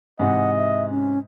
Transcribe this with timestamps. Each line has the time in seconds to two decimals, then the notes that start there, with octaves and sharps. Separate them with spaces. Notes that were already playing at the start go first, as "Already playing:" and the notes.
0.19 G#2 C3 E3 D#5 F#5
0.56 E5
0.91 C#4